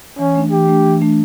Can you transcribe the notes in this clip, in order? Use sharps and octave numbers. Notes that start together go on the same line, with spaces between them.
E3 C#4
A3 D4
E3 G4
A3 D4
E3
A3 D4